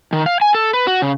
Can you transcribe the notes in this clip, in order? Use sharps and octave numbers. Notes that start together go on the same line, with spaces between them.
D#3
F5
G#5
A4
B4
F#4
C#3